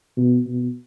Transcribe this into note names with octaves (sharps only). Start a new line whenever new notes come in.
B2
B2